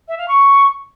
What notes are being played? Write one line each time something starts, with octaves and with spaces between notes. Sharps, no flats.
E5
F5
C#6